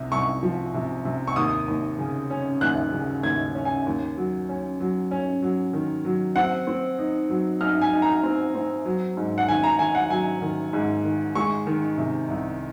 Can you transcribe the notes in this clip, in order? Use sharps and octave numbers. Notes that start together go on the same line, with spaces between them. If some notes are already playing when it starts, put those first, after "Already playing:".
Already playing: C2 C3
C2 C#6
F3
C3
C3
C#6
D#2 D#6
D#2
C#3
C#4
D#2 F#6
C#3
D#2 G#6
C#4
G#5
D#2
F#3
C#4
F#3
C#4
F#3
D#3
F#3
C4 F#5
C4
D#4
F#3
D#4 F6
G#5
D#4
A#5
C4
C4
F#3
G#2
F#5
D#3 G#5
A#5
D#3 G#5
F#5
F#3 G#5
D#3
G#2
D#3
G#3 C#6
D#3
C3
C2